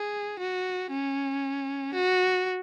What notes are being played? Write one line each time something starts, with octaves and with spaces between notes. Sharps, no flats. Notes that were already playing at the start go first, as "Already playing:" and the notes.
Already playing: G#4
F#4
C#4
F#4